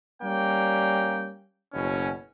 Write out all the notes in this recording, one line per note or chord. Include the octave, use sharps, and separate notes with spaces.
G3 A#3 C#4 G5
F#1 B2 C#4